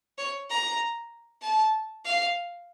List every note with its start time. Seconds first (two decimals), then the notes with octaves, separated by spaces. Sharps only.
0.18 C#5
0.50 A#5
1.42 A5
2.05 F5